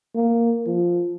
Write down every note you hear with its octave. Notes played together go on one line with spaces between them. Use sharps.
A#3
F3